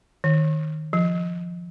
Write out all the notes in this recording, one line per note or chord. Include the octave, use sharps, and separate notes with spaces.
D#3
F3